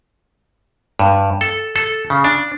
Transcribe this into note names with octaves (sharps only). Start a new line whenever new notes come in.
G2
A4
A4
C#3
D4